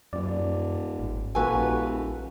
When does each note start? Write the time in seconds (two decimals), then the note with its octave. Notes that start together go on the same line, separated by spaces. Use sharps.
0.13 D#1 F#2 D5
0.99 G#1
1.35 D#1 A#1 A#3 F#4 A4 B4 G#5